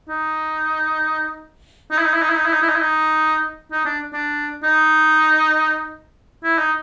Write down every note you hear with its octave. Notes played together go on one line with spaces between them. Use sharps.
D#4
D#4
E4
D#4
E4
D#4
E4
D#4
E4
D#4
E4
D#4
E4
D#4
D#4
D4
D4
D#4
E4
D#4